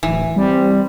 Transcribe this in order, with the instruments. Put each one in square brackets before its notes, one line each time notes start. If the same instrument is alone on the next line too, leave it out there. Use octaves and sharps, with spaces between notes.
[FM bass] D1 [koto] E3
[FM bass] G3 [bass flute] C4